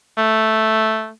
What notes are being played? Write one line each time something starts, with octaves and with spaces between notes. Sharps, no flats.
A3